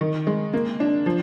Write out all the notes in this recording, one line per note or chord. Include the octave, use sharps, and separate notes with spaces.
D#3
G#3
A#3
D4
F3